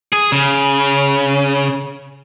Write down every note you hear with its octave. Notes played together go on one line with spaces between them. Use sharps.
G#4
C#3